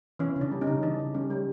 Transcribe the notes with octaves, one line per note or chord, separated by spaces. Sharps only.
E3 C#4
C#3
D4
G3
C#4 D#4
C#3
E3 D4
C#3
G3 C#4
G3